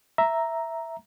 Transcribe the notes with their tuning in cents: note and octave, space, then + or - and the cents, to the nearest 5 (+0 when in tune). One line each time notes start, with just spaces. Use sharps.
E5 +0 A#5 +0